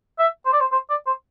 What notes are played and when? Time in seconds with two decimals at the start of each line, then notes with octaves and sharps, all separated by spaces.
0.19 E5
0.46 C5
0.53 D5
0.60 C5
0.72 C5
0.90 D5
1.06 C5